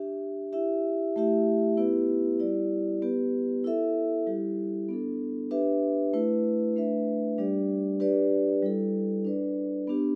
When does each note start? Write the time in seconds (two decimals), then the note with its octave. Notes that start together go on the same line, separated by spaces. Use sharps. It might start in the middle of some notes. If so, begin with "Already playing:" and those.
Already playing: D4 G4 E5
0.53 E4 G4 E5
1.16 A3 E4 G4 E5
1.77 B3 E4 G4 B4
2.40 G3 E4 G4 D5
3.02 B3 G4 B4
3.64 E4 A4 E5
4.27 G3 E4 G4
4.89 B3 D4 A4
5.51 D4 G4 B4 E5
6.13 A3 E4 B4
6.76 A3 D4 B4 E5
7.38 G3 D4 G4 D5
8.00 D4 G4 B4 D5
8.62 G3 E4 A4
9.25 D4 B4 D5
9.87 B3 D4 G4